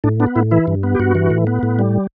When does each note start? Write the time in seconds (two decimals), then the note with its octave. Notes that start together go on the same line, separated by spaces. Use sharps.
0.04 A2 D4
0.20 B3 D4
0.35 A2 E4
0.51 E3 E4
0.67 G2
0.83 B3
0.95 G4
0.99 G2 F#4
1.15 E3
1.30 A2
1.47 B3
1.63 A2
1.79 G3